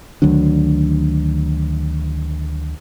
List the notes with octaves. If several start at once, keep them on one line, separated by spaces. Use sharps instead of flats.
D2 D#3 F#3 D4